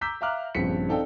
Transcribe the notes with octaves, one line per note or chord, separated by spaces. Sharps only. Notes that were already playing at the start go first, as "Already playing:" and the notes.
A#5 D6 E6 G6 B6
E5 F5 A#5 D6 F6 F#6
A#1 G2 C#3 C4 B6 C#7
C4 D#4 A4 D5 F5 G5